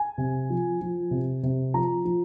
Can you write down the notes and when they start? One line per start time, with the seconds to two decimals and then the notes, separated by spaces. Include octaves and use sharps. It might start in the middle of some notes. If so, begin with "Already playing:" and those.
Already playing: G#5
0.18 C3
0.50 F3
0.81 F3
1.11 C3
1.43 C3
1.74 F3 A#5
2.05 F3